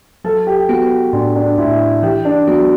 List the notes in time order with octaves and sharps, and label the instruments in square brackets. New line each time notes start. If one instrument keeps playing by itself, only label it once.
[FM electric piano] F#3 [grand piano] A4
[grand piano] G4
[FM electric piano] B3 [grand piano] F#4
[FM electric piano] A2 [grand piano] D4
[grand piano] D4
[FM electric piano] A2 [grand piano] E4
[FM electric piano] E3 [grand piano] G4
[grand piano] D4
[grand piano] F#3 [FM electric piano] B3